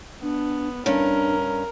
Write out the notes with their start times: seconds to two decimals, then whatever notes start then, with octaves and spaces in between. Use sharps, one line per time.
0.22 B3 D4
0.86 G2 C#4 D4 A#4